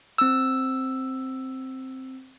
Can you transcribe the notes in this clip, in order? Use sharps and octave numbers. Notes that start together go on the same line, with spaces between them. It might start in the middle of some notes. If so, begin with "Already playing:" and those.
C4 E6